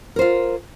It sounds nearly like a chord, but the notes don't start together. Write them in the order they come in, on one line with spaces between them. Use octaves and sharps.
A#4 C5 F4